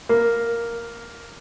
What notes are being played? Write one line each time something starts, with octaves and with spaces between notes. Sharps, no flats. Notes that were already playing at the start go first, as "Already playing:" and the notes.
A#3